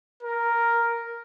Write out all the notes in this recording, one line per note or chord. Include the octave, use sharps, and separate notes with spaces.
A#4